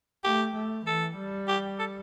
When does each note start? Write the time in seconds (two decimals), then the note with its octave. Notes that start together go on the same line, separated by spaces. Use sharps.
0.24 A3 G4
0.56 A3
0.86 E3 A4
1.18 G3
1.48 G4
1.79 A4